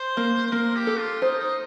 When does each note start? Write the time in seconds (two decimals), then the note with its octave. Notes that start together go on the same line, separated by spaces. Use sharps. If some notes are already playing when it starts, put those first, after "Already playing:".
Already playing: C5
0.17 A#3
0.47 C5
0.52 A#3 A#4
0.76 G4
0.87 A4
0.99 F4
1.22 D#4 C5
1.39 D#4